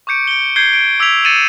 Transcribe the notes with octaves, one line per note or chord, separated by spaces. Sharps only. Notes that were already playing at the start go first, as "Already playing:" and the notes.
C#6 D6 G6 C#7 D7
D7 G7
G6 G#6 C7 G7
D7
D6 E6 G#6 B6 F7 G7
A6 C#7 D#7 E7 F#7